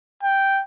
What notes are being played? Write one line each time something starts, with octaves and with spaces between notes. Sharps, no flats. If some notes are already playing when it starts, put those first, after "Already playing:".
G5